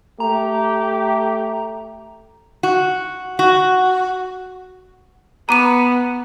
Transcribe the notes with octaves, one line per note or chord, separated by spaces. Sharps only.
A3 G4 A#5
F#4
F#4
B3 A#5 D6 D#7